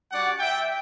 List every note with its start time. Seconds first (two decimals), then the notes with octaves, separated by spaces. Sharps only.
0.11 G3 D4 F#4 D5 F#5
0.40 E5 G5